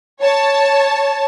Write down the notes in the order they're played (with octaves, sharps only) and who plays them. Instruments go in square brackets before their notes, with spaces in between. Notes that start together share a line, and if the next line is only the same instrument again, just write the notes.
[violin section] C#5 A5